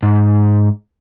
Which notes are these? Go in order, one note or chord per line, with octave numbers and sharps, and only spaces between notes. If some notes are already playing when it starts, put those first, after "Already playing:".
G#2